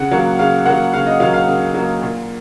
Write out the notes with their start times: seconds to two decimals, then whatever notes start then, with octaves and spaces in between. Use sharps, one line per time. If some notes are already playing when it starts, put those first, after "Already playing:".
Already playing: C#3 F#5
0.11 F#3 A#3
0.39 C#3 F5
0.65 F#3 A#3 F#5
0.93 C#3 F5
1.07 D#5
1.20 F#3 A#3 F5
1.34 F5
1.47 C#3
1.74 F#3 A#3
2.02 A#2